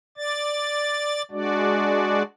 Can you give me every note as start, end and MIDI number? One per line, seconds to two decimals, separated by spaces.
0.17 1.22 74
0.17 1.22 93
1.31 2.22 56
1.31 2.22 62
1.31 2.22 66
1.31 2.22 74